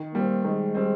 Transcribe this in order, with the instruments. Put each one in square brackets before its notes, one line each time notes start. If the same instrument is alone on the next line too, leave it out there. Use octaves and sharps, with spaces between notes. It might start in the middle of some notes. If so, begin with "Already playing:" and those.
Already playing: [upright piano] D#3
[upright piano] G3 C4 [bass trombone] A#3
[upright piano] D#3 [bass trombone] G#3
[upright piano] G3 C4